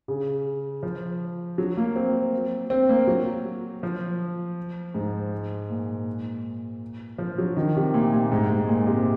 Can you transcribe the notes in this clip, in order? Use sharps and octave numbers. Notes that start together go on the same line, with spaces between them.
C#3
F3
F#3
A#3
C4
C4
A#3
F#3
F3
G#2
A#2
F3
F#3
D#3
C3
A#2
A#2
G#2
G#2
A#2
C3